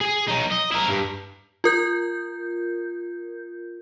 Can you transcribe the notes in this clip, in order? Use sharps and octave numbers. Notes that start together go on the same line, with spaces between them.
G#4 G#5
F#3 D#4
D#5
E4 A#4
G2
F4 A#4 G6